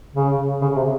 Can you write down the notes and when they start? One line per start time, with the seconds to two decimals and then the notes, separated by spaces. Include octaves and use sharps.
0.15 C#3
0.62 C#3
0.76 C3